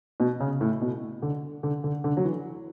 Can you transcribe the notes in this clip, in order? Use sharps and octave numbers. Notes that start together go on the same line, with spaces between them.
B2
C#3
A2
B2
D3
D3
D3
D3
F#3
E3